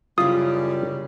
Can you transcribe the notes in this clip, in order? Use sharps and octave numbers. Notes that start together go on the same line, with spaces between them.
F#2 C#3 F3 G3 E4 F4 D#6